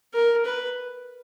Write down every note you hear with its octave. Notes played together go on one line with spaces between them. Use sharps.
A#4
B4